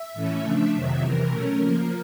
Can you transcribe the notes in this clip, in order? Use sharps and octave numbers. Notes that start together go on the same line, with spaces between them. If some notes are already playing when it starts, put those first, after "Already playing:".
Already playing: E5
A2 E3 A3 C#4
C#3 F3 A3 D4 E5
F2 C3 D#3 F#3 E5
E2 C3 E3 A#4
B2 F#3 A3 C#4
C#3 F3 A#3